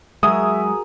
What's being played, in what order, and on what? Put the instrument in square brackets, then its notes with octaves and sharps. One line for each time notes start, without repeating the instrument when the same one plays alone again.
[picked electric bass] F#3 G#3 [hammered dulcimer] F#4 G#4 A#4 [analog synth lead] E5 [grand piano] D#6